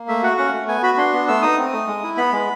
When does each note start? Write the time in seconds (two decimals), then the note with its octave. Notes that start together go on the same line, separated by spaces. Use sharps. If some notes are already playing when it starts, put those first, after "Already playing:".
Already playing: A#3
0.08 A3 E5
0.23 F#4 F#5
0.38 C#4 F#5
0.53 A3
0.68 B3 G#5
0.83 F#4 B5
0.97 D4 C6
1.13 B3
1.28 A3 E6
1.42 D#4 D#6
1.58 C4
1.73 A3
1.87 G#3
2.03 E4
2.17 B3 B5
2.33 G#3